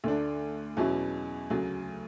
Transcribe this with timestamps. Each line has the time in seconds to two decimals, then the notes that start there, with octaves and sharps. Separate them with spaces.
0.04 D2 D3 A3 D4
0.77 E2 B2 F#3 C#4 E4
1.50 D2 C#3 F#3